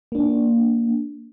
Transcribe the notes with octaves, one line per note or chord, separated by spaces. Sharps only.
A#3 D4